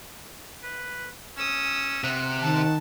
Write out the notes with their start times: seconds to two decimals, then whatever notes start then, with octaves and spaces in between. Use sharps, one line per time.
0.63 B4
1.37 C#4 D#6 E6
2.04 C3 F#5
2.41 D#3 A5